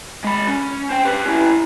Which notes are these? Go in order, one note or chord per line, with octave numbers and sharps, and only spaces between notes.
G#3 B5
C#4
C5 G5
G4 B4
C#4 E4